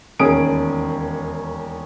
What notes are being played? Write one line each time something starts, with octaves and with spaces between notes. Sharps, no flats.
E1 D#2 C#4 G#4 D#6 D7